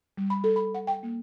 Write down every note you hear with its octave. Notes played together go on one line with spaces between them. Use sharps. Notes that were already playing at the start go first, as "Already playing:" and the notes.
G3
B5
A4
B5
F#5
G5
A#3